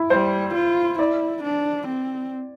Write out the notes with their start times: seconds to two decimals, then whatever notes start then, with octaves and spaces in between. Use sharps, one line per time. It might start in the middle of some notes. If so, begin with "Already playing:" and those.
Already playing: E4
0.10 G3 C5
0.54 F4
0.99 E4 D5
1.44 D4
1.88 C4